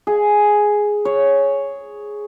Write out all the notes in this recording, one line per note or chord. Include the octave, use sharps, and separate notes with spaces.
G#4
C#5